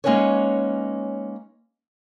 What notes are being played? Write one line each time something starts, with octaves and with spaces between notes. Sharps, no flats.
G#3 A#3 C#4 D#4 B4 C#5